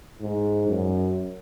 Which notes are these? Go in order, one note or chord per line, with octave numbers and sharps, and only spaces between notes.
G#2
F#2